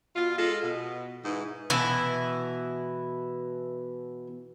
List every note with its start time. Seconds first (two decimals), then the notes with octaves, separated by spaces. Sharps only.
0.16 B2 F4
0.38 G#3 F4 A4
0.63 B2
1.24 G#2 E3
1.70 B2 E3 E4